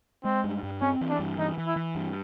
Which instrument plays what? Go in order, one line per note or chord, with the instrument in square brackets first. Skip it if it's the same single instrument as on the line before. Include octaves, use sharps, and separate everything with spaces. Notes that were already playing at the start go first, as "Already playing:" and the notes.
[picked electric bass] G#3 [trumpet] C4
[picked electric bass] G2
G2
[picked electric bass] C4 [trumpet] C#4
[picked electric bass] E3
[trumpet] D4
[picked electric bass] G2
[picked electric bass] E3 [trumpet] D#4
[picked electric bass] E3
[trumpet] E4
[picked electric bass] E3
G2